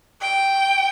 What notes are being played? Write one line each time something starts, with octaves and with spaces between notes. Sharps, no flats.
G5